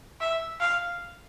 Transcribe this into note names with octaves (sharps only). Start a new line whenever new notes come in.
E5
F5